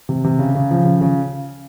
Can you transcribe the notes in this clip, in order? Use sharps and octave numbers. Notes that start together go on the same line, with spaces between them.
C3
C3
C#3
C#3
F3
C#3
C#3